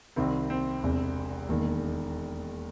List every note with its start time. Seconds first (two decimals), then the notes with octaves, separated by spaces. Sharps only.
0.16 C2 C3 D#3 C4
0.50 C4
0.83 E1 E2 C3
1.48 E1 D#2 D#3